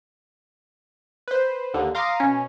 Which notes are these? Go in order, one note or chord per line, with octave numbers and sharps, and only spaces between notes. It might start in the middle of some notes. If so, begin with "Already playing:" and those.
B4 C5
D#2 D3
F5 A#5 C6 D6 D#6
B2 C#4